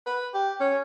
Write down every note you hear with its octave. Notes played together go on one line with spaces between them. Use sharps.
B4
G4
C#4